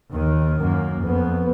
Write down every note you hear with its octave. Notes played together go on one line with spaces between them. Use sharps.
D#2 D#3
F#2 A#3
F2 B3